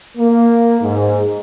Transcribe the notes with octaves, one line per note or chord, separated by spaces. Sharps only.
A#3
G#2